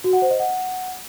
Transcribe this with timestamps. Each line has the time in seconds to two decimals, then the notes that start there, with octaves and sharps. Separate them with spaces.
0.04 F#4
0.13 F#5
0.22 C5
0.31 D#5
0.40 F#5